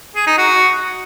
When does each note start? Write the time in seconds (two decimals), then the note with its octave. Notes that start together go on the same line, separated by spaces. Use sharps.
0.16 G#4
0.27 D#4
0.38 F#4